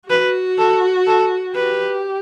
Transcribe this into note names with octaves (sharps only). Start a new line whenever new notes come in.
F#4 B4
A4
A4
G4 B4